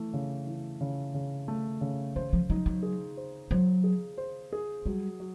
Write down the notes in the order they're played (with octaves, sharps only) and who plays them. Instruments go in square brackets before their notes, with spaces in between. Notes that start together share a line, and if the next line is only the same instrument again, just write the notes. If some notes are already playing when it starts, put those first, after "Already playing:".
Already playing: [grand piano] E3 A3
C#3
E3
C#3
C#3
A3
C#3
[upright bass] E3 [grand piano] C5
[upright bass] F3
[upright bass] F#3 [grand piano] D#4
[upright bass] F#3
[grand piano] G#4
C5
[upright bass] F#3 [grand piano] C5
[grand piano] G#4
C5
G#4
[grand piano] F#3 [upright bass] G3
[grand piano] F#3